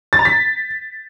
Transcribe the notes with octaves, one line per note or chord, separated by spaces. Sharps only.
A6
A#5
B6